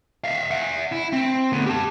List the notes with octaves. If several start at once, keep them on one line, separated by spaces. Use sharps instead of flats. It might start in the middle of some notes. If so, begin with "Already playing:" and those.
E5 F5
E5 F#5
E4
C4
D2 B3
G4 A5